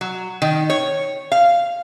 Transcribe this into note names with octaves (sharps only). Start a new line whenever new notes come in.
F#3
D#3
C#5
F5